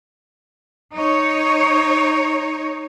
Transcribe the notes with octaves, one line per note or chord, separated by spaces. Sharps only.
D#4 C#5